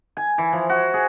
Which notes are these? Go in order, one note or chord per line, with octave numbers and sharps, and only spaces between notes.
G#5
E3
F3
F#4
G#4